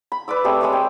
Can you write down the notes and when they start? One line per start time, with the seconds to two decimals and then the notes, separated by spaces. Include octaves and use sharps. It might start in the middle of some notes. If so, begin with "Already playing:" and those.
0.12 B5
0.28 B4 D5 D6 E6
0.44 G3 A3 C4 G#4
0.61 G#3 G#4 C#5 E5
0.73 G5